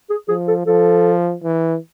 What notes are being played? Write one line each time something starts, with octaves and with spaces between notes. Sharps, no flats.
G#4
F3 G#4
A4
F3 A4
E3